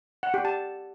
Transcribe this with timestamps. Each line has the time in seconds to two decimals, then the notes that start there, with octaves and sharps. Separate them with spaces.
0.23 F#5
0.34 G4
0.45 A5